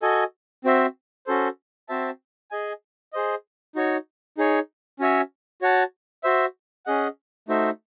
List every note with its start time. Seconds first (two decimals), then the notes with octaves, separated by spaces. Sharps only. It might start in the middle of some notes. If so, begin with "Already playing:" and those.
0.02 F#4 A4 D#5 G#5
0.64 C4 F#4 C5 E5
1.27 C#4 F#4 A4 C5
1.89 C4 F#4 C5 E5 A5
2.51 G#4 D#5 G#5
3.13 G#4 C5 D#5
3.75 D#4 F#4 C#5
4.38 D#4 G#4 C#5
4.99 C#4 F#4 C#5 E5 G#5
5.62 F#4 C#5 F#5 A5
6.24 F#4 C5 E5
6.86 C#4 G#4 D#5 F#5
7.48 A3 D#4 F#4 C5 E5